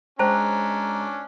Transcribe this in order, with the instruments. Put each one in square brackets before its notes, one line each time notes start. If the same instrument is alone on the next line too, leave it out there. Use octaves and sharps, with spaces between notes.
[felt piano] G#3 [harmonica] C#4 D4 [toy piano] C5 G5 A5 [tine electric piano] A#5